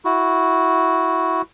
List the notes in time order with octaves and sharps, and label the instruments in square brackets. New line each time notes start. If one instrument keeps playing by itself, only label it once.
[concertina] E4 F#4